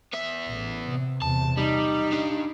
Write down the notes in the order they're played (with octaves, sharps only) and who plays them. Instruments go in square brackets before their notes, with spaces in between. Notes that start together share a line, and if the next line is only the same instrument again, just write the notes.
[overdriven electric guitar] B3 E5
[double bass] A1
C3
[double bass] E2 C3 [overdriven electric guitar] A5
[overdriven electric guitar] G3 [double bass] D#4
[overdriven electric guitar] D4 G4